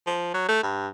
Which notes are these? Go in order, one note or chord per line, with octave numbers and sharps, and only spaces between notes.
F3
F#3
A3
G2